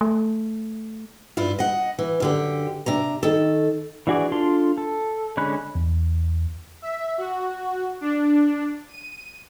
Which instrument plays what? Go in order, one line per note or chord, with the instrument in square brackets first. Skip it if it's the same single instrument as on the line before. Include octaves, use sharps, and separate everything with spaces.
[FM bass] A3
[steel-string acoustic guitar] G2 E4 F4
D#5 F#5
E3
F#2 D3 G4
C3 D4 A#5
D#3 A4
[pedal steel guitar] E3 D4 F#4 G#4 D5
D4 F4 A4 C6
A4
D3 G#3 C#4 B5 F#6
[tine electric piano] E2
[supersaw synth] E5
F#4
D4
D#7